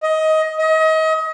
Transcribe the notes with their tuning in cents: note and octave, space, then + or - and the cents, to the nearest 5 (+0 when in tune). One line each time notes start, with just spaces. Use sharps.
D#5 +20
D#5 +35